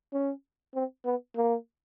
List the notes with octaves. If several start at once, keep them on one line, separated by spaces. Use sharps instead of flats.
C#4
C4
B3
A#3